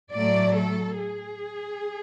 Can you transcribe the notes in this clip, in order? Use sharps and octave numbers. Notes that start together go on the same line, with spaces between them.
A2 F#3 A3 D5
A4
G#4